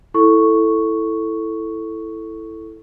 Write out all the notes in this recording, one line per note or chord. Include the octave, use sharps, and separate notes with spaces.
E4 A4 C#6